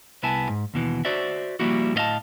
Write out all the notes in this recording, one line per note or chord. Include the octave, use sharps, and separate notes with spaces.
C2 B3 E4 E5 G#5 A5
G#2
D#2 B2 E3
F#4 C5 D5 E5
F3 G3 A#3 E4 F#4
A2 B3 D#5 F5 A5